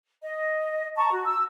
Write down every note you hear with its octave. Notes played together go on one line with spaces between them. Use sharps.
D#5
A5 A#5 C#6
F#4
E6